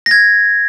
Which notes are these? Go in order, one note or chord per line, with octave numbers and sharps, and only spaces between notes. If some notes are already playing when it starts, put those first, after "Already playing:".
A#6
G#6